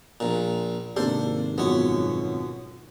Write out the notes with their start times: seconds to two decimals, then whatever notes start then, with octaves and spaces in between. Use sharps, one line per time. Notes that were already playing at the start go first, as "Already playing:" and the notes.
0.20 A#1 A#2
0.96 G#1 C3 A#3 D4 A4 C5
1.58 F#2 B2 F3 B3 C#5